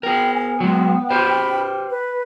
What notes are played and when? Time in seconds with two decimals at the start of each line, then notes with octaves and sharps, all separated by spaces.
0.03 B3 G#4 A#4 G5
0.34 G#5
0.60 F#3 G#3 G5
1.10 G4 B4 C5 B5
1.90 B4